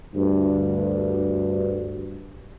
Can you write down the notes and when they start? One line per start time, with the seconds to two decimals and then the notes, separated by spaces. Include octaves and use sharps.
0.15 D2 G2